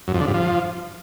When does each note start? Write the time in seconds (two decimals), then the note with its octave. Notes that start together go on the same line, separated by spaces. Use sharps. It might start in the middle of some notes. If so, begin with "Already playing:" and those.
0.08 F#2
0.14 F2
0.21 D3
0.27 G2
0.34 F3